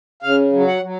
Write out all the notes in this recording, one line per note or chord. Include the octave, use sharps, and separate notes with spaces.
C#3 F5
F#3
F#5
F#3